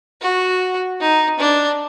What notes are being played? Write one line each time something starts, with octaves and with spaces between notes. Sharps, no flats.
F#4
D#4
D4